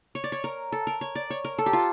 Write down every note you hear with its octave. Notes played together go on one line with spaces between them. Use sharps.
C#5
D5
C#5
A#4
A4
A#4
C#5
D5
C#5
A#4
A4
G4
F4